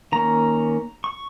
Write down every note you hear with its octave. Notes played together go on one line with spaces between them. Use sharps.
D#3 A#3 C#4 A#5
C#6